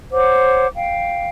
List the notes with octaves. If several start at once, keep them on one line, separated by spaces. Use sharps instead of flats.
C5 C#5 F#5 D6
F5 G5